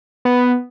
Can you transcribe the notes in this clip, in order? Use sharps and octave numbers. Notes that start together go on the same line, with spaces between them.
B3